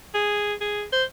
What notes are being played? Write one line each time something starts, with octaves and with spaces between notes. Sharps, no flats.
G#4
G#4
C5